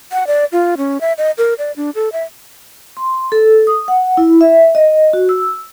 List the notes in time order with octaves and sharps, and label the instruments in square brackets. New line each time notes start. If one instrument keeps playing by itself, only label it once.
[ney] F#5
D5
F4
C#4
E5
D#5
A#4
D5
D4
A4
E5
[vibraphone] C6
A4
D#6
F#5
E4
E5
D#5
F#4
E6